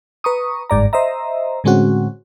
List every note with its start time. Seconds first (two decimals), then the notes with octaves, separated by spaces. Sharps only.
0.24 B4 A#5 C#6 D#6
0.70 G1 G#2 D5 A#5
0.93 C5 D#5 E5 A#5
1.64 A2 D3 G#3 C4 C#4 F#4